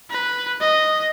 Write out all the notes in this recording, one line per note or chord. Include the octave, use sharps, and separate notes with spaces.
B4
D#5